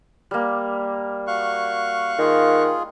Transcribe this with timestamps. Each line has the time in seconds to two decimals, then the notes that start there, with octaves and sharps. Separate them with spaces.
0.31 G3 A#3
1.27 F#4 F5 C#6 F#6
2.19 D#3 F4 G#4